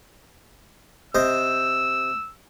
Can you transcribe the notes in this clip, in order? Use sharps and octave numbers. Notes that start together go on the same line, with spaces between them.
C3 C5 D#5 E6